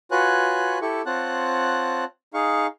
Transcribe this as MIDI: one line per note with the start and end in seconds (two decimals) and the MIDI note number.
0.11 0.79 65
0.11 0.79 66
0.11 0.79 71
0.11 0.79 73
0.11 0.79 80
0.11 0.79 90
0.82 1.02 64
0.82 1.02 67
0.82 1.02 69
0.82 1.02 85
1.06 2.04 60
1.06 2.04 65
1.06 2.04 73
1.06 2.04 78
1.06 2.04 81
1.06 2.04 90
2.34 2.67 63
2.34 2.67 68
2.34 2.67 77
2.34 2.67 85